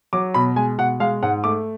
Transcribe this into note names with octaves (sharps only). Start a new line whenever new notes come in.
F#3 D6
B2 B5
G#3 G#5
B2 F#5
G#3 F5
G#2 F#5
A3 D6